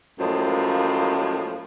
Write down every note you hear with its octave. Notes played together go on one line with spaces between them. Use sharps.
F#2 A2 F3 G#3 A#3